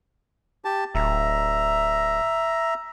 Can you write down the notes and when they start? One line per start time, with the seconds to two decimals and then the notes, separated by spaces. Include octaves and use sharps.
0.65 G4 A5
0.95 D1 E5 A#5